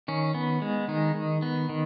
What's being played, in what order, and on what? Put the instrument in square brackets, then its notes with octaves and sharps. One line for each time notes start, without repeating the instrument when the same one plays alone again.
[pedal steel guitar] D#3 C#4
B3
G#3
D#3 D#4
D#3
B3
D#3